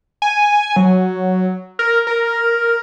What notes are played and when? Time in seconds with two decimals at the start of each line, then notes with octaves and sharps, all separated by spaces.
0.22 G#5
0.76 F#3
1.79 A#4
2.07 A#4